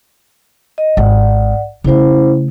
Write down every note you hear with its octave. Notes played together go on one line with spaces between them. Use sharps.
D#5
G#1 D5 F#5
C#3 A3 C#4 E4 C5